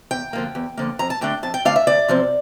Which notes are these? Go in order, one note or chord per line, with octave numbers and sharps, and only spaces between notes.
E2 G5
D3 F3 A#3
E2
D3 F3 A#3
F2 A#5
A5
D3 A3 D4 G5
F2 A5
G5
D3 A3 D4 F5
E5
D2 D5
C3 F3 C4